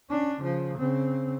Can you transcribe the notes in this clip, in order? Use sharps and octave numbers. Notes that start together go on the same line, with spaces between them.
C#4 D4
C#3 F3
C#3 C4